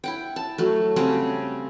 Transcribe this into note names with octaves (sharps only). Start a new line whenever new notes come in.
E4 F#5 G5
A5
F#3 A3
C#3 G3 C4 F#5